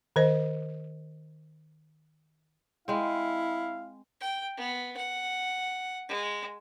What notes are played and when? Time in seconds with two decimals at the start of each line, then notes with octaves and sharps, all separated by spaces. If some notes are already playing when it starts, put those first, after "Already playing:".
0.16 D#3 C5 D#5
2.88 G#3 C4 E4 F5
4.21 G5
4.57 B3
4.97 F#5
6.09 G#3